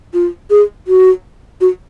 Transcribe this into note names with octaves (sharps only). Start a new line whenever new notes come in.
F4
G#4
F#4
F#4